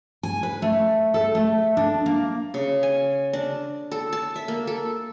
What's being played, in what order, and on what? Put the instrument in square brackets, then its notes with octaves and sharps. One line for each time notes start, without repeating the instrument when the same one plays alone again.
[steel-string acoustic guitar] G#5
B4
A3
A4
A3
D4
A#3
[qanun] C#3
G#5
D4
A4
A5
E5
A#3
A4